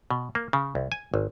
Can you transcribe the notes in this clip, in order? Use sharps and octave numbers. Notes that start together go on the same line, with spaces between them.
B2
A#3
C#3
C2
G#5
G#1